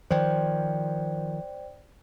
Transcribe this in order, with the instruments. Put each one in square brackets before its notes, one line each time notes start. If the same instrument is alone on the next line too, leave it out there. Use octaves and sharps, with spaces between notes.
[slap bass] D#3 F3 [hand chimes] C5 D5 G5